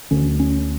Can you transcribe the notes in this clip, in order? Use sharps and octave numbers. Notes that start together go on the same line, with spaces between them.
D2 D3 C#4
C#4